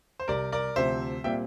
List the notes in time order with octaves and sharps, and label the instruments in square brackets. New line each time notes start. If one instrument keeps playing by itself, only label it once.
[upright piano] C5
[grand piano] C2 C3 G3 [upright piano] A#4 D5
[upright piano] A#4 D5
[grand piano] D2 C3 F3 C4 [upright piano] C5 E5
[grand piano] A#2 G3 C4 F4 [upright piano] E5 G5